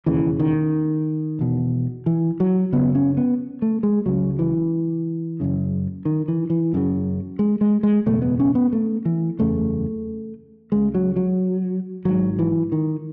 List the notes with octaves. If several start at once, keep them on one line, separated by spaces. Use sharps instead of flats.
E1 D#2 C#3 E3
D#3
E1 E2 B2
E3
F#3
F#1 F#2 C#3 B3
C#4
B3
A3
G#3
C#2 C#3 F#3
E3
F#1 F#2 C#3
D#3
E3
E3
F#1 F#2 C#3
G#3
G#3
G#3
F#1 E2 B2 A3
B3
C#4
B3
A3
E3
F#1 E2 C#3 A3
C#2 C#3 G#3
F#3
F#3
G#1 G#2 F#3
E3
D#3